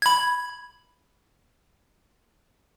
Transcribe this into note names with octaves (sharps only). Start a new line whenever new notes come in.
B5 G#6